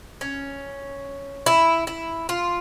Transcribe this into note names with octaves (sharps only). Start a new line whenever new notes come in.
C#4
E4
E4
F4